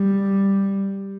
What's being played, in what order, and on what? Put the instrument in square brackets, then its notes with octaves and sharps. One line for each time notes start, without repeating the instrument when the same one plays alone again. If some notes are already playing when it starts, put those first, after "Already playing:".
Already playing: [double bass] G3